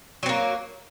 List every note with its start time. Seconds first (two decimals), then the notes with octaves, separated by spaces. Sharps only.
0.23 F#3
0.26 C4
0.29 A#3